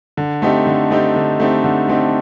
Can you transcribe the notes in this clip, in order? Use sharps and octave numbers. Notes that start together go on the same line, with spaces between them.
D3
A3 C4 D#4 G4
D3
A3 C4 D#4 G4
D3
A3 C4 D#4 G4
D3
A3 C4 D#4 G4